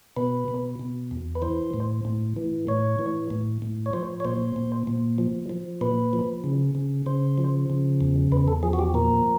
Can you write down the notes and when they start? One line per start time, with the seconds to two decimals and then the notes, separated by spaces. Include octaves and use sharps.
0.17 B2 B4
0.48 B2
0.79 B2
1.11 E2
1.35 B4
1.42 E3 C5
1.74 A2
2.05 A2
2.36 E3
2.67 A2 C#5
2.99 E3
3.30 A2
3.62 A2
3.86 C#5
3.93 F3 C5
4.20 C#5
4.25 A#2 C5
4.56 A#2
4.87 A#2
5.18 F3
5.50 F3
5.81 A#2 B4
6.13 F3
6.44 C#3
6.75 C#3
7.06 C#3 C5
7.38 F3
7.70 C#3
8.01 E2
8.32 E2 B4
8.48 A4
8.63 F3 G#4
8.73 F#4
8.79 G4
8.94 A#2 A#4